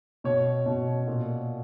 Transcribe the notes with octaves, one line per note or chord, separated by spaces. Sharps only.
B2 C#5
B2
A#2